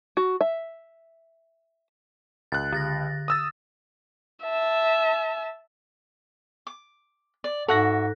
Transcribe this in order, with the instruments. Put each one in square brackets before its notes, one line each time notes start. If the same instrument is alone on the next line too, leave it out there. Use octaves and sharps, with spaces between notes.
[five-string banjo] F#4
E5
[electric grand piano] C#2 F#6 [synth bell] A6
[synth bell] D3 A6 A#6
[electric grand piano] D#6 E6 A6
[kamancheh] E5 A5
[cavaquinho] D6
D5
[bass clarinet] G#2 [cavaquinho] F#4 E5 [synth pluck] A4 F#6 A#6